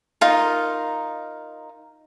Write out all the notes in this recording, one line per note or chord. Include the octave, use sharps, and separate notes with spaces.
D#4 F4 A#4